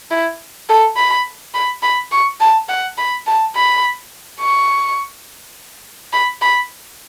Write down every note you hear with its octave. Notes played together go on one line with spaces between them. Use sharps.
E4
A4
B5
B5
B5
C#6
A5
F#5
B5
A5
B5
C#6
B5
B5